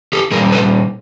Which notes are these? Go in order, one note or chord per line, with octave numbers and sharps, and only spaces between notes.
G4 A4
A#2 G3 G#4 A#4
A4 B4